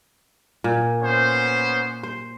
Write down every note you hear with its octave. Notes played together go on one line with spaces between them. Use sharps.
A#2
B3 C#4 C5
C5